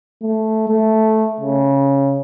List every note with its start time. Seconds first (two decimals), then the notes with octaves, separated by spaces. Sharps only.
0.22 A3
0.68 A3
1.40 C#3